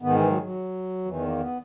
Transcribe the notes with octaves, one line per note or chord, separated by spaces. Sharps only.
G#2 D#3 B3
E3
F#3
F#3
E2 D#3 E3
A#3
B3